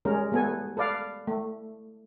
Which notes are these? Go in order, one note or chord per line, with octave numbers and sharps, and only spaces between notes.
G3 G#3 C#4 A#4
G3 A3 B3 A4 G#5
A4 B4 D5 F5
A3